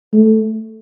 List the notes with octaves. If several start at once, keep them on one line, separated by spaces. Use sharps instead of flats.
A3